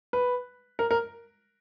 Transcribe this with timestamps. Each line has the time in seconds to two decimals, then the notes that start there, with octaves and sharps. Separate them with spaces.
0.13 B4
0.79 A#4
0.91 A#4